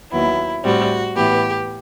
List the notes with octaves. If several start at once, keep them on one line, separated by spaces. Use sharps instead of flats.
D#2 D#3 F#3 B3 E4
A2 G3 C4 F#4
A2 E3 B3 G4